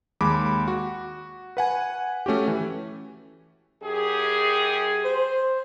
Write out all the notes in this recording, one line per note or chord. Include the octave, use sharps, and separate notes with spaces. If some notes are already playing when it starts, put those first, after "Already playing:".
D#2 G#3 B5 D6
F#4
B4 F#5 G#5
A3 C#4 F#4 G4
E3
F#2 G4 G#4
C5